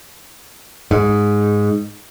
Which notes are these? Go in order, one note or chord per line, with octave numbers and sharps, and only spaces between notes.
G#2